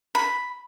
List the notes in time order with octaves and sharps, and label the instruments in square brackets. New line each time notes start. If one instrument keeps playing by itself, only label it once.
[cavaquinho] B5